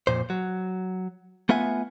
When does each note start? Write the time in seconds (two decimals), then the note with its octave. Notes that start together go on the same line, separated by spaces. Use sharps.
0.07 F2 A#2 C5
0.30 F#3
1.49 A3 B3 F4 E5 F#5 G#5